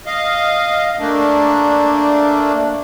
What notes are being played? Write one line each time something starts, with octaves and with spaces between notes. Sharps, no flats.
D#5 F5
A3 A#3 D4